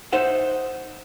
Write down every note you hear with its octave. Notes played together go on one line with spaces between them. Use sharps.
D#4 C5 E5 F#5